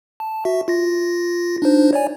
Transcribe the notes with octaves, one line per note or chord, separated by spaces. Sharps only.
A5
F#4 E5
F4 A#6
D4 D#4 C5
C#5 D5 G#5